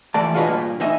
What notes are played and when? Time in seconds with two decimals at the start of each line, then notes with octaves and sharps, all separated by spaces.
0.14 E3 F3 G3 A3 D5 A5
0.34 F4 F#4 G#4 B4 C#5 D#5
0.47 G2 A#2
0.80 E2 A2 D#4 D#5 E5 G#5